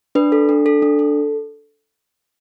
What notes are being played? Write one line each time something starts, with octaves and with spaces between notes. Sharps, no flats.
D4 B4
A4
D4
A4
D4
A4